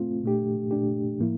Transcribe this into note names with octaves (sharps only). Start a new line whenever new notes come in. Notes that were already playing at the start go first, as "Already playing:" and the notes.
Already playing: A3 C4 F4
A#2 A3 D4 G4
A#2 A3 D4 G4
A2 F3 A#3 E4